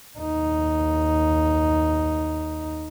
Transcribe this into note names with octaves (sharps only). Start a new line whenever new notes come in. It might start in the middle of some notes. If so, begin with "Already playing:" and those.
D#2 D#4